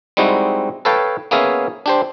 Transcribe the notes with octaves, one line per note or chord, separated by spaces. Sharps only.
G3 G#3 C4 D#4 E4 F#4
A4 B4 C#5 F5 G5 A5
A#3 B3 C#4 G#4 E5 F5
D4 G4 C5